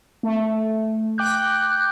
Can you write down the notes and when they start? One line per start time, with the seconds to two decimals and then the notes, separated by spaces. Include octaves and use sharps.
0.23 A3
1.18 G5 D6 F#6 G6